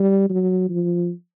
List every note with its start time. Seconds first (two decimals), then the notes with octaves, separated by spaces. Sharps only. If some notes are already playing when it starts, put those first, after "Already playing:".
Already playing: G3
0.30 F#3
0.69 F3